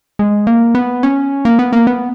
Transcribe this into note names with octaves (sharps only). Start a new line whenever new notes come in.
G#3
A#3
B3
C#4
A#3
B3
A#3
B3